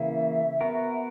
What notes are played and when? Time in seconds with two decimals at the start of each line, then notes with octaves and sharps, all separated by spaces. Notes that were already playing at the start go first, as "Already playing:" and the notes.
Already playing: C#3 E3 A#3 E5
0.61 B3 F#4 A#4